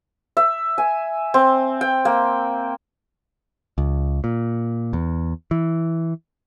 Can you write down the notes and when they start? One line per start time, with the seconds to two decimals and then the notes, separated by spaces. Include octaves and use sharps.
0.37 E5
0.78 G#5
1.34 C4
1.81 G5
2.05 A#3
3.78 C#2
4.24 A#2
4.93 E2
5.51 E3